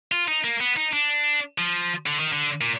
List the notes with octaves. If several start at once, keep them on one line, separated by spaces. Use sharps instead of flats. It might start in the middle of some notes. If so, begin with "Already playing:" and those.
F4
D#4
A#3
B3
D#4
D4
F3
D3
D#3
D3
A#2